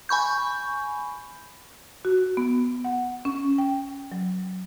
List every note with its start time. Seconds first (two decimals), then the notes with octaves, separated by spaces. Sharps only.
0.09 G#5 B5 C#6 G6
2.05 F#4
2.37 B3
2.84 F#5
3.25 C#4
3.58 G5
4.12 F#3